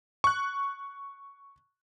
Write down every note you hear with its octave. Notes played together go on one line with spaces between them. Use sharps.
C#6 F#6